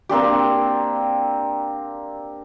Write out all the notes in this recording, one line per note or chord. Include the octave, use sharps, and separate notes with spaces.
A#3 C4 D4 G4